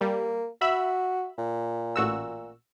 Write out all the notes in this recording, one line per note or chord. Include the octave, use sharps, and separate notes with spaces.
G3 A#3
F#4 E5 B5 E6
A#2
A1 F#4 E6